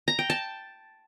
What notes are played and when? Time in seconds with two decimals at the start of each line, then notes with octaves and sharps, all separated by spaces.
0.08 A#5
0.19 G5
0.30 A5